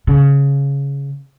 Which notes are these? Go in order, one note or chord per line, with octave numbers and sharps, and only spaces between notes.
C#3